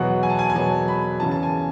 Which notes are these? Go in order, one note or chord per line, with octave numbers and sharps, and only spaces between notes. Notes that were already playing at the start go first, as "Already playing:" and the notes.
Already playing: E2 B2 F#3 F#5
G#5
A5
G#5
G#5
E2 B2 F#3 A5
B5
E2 C#3 E3 A5
A5
G#5